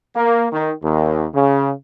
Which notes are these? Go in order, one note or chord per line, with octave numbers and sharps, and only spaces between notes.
A#3
D#3
D#2
C#3